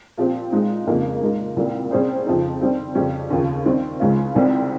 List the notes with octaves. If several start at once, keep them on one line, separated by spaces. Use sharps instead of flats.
A#2 F3 C4 G4
A#2 G#3 D#4
F2 C#3 F3 A#3 D#4
A#2 G#3 D#4 A#4
C2 A#2 G3 A#3
C3 G3 C#4 G#4 C5
F2 C#3 F3 C4 D#4
D#3 G3 C4
F2 C#3 G3 C#4 G4
D#2 C#3 F3
D#3 G3 C4
C#2 C#3 G#3 C#4 F4
C2 C3 D#3 G3 C4